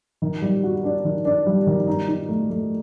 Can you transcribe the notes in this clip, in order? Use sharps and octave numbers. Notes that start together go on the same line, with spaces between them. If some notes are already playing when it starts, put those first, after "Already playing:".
D#3
G3
F#4
D4
D#3
D4
G3
D#3
D#4
D#4
A3
A3